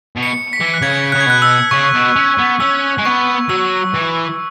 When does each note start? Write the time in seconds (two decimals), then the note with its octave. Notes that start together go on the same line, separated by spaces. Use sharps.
0.16 B2
0.23 C#7
0.53 B6
0.60 E3
0.74 F#6
0.82 C#3 G#6
1.12 C#3 F#6
1.20 G#6
1.27 B2 F#6
1.42 E6
1.71 C#3 C#6
1.94 B2
2.16 C#4
2.38 B3
2.60 C#4 E6
2.98 G#3
3.05 B3 C#6
3.49 F#3 E6
3.95 E3